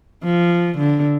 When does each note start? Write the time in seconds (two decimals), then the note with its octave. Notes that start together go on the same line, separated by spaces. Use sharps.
0.24 F3
0.78 D3